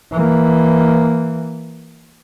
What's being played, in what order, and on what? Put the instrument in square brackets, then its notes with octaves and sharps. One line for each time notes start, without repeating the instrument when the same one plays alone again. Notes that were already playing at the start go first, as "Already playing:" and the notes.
[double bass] E3 A#3